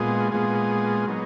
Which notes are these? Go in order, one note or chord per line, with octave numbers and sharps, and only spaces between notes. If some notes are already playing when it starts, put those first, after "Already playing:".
Already playing: A#2 G#3 B3 F4 G#4
A#2 G#3 B3 F4 G#4
F#3 B3 D#4